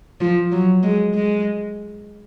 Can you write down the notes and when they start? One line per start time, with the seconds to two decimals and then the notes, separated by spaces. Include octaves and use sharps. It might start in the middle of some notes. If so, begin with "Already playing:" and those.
0.21 F3
0.52 F#3
0.83 G#3
1.14 G#3